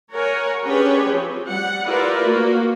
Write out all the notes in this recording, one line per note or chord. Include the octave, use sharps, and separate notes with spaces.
A#4 C#5 F#5 G#5
C#4 D4 G4 G#4 B4 C#5
F3 C4
G3 F#5
E4 F4 G4 A#4 B4 D5
A#3 F#4